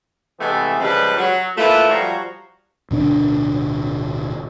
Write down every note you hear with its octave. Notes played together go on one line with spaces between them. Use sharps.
C3 E3 G#3 A3 B3
C#3 F3 G3 G#3 A4 B4
F#3
A3 A#3 E4 F4 A#4 B4
F3 G3 F#4 C#5 A#5
D1 B2 D4